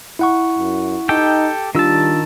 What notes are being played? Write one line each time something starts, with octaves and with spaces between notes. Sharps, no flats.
E4 F#5 C#6
F#2
D#4 G4 A4 G5
D#3 G3 D4 F4 A5 E6